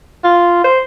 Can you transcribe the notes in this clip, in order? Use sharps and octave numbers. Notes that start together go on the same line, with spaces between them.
F4
C5